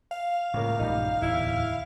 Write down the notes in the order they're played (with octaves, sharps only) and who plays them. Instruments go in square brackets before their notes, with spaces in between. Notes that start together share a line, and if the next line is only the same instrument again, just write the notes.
[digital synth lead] F5
[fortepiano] C#2 A#3 [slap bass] A2
[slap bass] A#1 G2 E3 [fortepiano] G3 D#4
[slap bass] D1 E2 [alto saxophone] E4